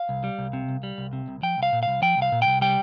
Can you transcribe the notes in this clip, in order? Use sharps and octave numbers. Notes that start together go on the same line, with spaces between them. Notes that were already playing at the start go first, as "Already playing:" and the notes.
Already playing: F5
C2
G3
C2
C3
C2
G3
C2
C3
C2
F3 G5
C2 F5
A#2
C2 F5
F3 G5
C2 F5
A#2
C2 G5
G3 G5